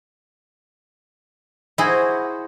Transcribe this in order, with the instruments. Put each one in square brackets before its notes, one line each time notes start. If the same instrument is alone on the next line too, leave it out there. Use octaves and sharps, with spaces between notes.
[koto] E4 G#4 [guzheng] F#4 C5 D#5